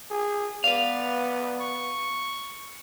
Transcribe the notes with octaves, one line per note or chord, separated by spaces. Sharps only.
G#4
B3 B4 D5 F5
C#6